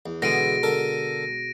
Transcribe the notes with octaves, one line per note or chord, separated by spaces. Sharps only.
E2
B2 D3 E3 G#3 B3 A#6 D7 D#7
D3 A4 A#4